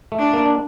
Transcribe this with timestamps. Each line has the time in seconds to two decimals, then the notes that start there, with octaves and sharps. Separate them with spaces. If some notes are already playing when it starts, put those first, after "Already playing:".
0.12 A3
0.19 D4
0.33 A#3
0.46 D4